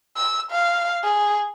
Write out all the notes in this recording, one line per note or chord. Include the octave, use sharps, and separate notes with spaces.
E6
F5
G#4